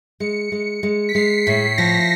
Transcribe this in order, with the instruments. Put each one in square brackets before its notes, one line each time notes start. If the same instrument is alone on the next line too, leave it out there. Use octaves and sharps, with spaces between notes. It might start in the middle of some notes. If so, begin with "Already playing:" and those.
[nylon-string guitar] G#3 [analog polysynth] C#7
[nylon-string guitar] G#3
G#3
[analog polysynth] B6
[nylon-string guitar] G#3 [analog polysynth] C7
[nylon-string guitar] A2 [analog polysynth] B6
[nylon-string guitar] F3 [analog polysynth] A#6